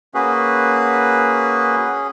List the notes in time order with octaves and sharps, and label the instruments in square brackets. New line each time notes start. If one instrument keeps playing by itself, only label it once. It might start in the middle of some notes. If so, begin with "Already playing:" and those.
[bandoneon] A#3 F#4 B4 [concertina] C#4 G#4